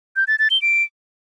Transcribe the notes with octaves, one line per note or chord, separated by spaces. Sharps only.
G6
A6
A6
G7
D7